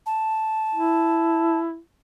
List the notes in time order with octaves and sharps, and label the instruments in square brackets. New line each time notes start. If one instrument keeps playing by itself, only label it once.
[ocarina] A5
[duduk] E4